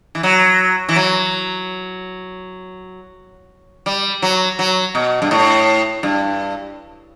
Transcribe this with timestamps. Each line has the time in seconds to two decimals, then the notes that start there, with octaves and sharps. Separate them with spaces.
0.15 E3
0.23 F#3
0.89 E3
0.96 F#3
3.86 G3
4.22 F#3
4.59 F#3
4.95 B2
5.22 G2
5.31 A2
6.03 G2